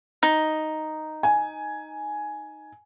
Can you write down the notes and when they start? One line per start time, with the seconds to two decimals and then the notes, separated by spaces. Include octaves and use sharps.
0.23 D#4
1.23 G#5